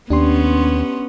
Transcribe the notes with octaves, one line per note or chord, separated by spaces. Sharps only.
D#2 B3 C#4 D4 G4 C6